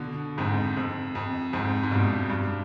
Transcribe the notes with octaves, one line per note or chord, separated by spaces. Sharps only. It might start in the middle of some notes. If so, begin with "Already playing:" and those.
Already playing: B2 D3
F2 G#2
F2
F2
F2 G#2
G#2
G2 B2
G2